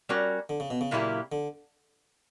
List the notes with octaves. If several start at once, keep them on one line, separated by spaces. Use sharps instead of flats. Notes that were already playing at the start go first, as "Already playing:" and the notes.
G3 C#4 F#4 A#4
D3
C#3
B2
C#3
A#2 F#3 A#3 E4 G4
D3